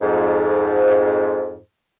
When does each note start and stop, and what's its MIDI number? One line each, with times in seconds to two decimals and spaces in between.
0.02 1.59 41
0.02 1.59 44